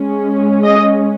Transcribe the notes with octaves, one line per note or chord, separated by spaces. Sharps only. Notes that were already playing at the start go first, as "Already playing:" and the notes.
Already playing: G#3 C#4
D#5